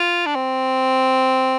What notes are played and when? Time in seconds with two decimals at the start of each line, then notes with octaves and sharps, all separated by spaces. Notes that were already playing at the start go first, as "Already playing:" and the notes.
Already playing: F4
0.26 D4
0.35 C4